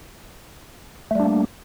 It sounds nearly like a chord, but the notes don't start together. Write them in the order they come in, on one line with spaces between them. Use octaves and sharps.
A3 G3 D4 A#3